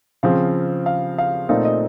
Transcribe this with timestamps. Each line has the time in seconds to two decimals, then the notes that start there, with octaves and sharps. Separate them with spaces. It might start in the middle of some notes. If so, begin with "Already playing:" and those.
0.23 C#3 F3 C4 F5
0.86 F5
1.18 F5
1.49 A#2 A3 C4 D#4 F5
1.65 D#5